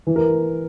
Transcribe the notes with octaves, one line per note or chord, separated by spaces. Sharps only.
E3
A#4